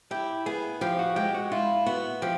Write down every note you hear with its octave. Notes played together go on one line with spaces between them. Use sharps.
E4 G4
B3 G#4
F3 G4
F#4
G#3 G4
F#4
E4 F4
B3 F#4
F3 G4